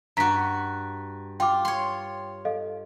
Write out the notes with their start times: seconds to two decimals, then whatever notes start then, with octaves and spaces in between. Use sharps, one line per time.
0.17 G2 F#4 A#5 B6
1.40 F4 G5 D6
1.65 C#5 C6
2.45 A4 D#5 F5